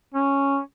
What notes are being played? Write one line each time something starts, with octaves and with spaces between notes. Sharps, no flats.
C#4